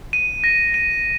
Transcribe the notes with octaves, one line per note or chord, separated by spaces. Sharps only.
D#7
A#6
D#7